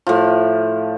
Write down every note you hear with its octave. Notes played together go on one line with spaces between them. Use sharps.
A2 F3